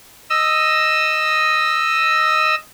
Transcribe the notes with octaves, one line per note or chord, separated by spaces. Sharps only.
D#5 E6